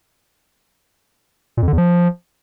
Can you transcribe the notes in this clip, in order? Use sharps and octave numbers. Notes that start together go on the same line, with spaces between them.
A#2
F2
D3
E2
F3